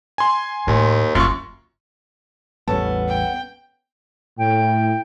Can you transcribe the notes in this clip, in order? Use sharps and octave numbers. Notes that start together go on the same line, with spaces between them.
G#5 C6
D#2 A2 A3
F#1 F#2 D4 F4 C#6
A1 E2 G3 B3 C#4 A4 A5
G5
A2 G5